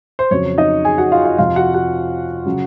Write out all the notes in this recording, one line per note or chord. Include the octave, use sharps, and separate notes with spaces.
C5
F2 C#3 F#3 C#5
D#4 D#5
G#4 G#5
F#4 F#5
F4 F5
F4 F5
F2 C3 F3 F4 F5
F#4 F#5
F#4 F#5
C#3 F#3